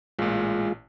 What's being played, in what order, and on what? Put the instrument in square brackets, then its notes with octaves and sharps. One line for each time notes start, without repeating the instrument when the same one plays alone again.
[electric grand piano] A1 A#2 [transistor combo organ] G#3 F4